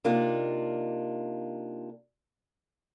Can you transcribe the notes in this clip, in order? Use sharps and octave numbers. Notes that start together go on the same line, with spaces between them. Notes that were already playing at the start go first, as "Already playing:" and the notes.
C3 A#3 D4 D#4 F4